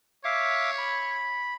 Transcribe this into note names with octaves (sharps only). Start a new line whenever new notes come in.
C#5 E5 F5 D6
B5